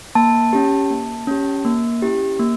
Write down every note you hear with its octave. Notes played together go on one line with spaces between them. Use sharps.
A#3 A5
C#4 G4
A#3
C#4 G4
A#3
C#4 E4 G4
A#3